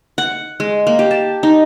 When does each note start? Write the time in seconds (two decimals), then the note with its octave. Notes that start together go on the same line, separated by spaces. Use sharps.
0.18 F#5
0.60 G#3
0.87 A#3
0.99 G4
1.11 A5
1.43 D#4